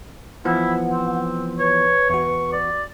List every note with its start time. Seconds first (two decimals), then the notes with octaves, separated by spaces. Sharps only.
0.45 E3 F3 B3 E4 F#5
0.90 C4
1.59 B4 C#5
2.10 E2 F#4 C#6
2.52 D5